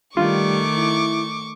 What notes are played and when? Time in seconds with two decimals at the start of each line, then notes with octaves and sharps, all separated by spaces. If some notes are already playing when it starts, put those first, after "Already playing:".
0.17 D#3 G3 A3 F4 C#6 D6
0.77 E4